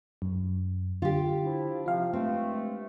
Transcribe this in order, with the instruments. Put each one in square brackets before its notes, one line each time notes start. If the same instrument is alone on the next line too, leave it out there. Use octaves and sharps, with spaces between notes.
[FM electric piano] F#2
[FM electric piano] D3 [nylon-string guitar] F4 G4
[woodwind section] F3 D4 E4
[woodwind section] C3 F3 [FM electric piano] F4 F5
[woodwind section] G2 G#3 A3 [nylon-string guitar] C4